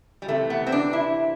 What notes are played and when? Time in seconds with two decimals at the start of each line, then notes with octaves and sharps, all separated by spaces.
0.22 G3
0.28 C3 E3 A3
0.50 B3
0.66 C4
0.72 D4
0.93 E4